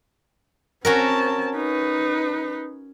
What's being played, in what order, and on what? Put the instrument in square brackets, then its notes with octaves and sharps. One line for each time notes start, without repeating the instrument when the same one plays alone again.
[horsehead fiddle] C4 A5 [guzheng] C#4 F#4 A#4
[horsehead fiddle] D#4 B4